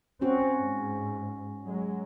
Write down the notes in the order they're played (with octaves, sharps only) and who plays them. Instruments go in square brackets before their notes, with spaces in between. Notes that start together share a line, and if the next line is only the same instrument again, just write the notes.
[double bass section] C4 [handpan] C#4 F#4
[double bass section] G#2
F#3 G#3